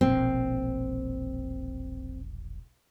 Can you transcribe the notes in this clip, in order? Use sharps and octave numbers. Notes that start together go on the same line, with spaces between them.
E1 A#1 C4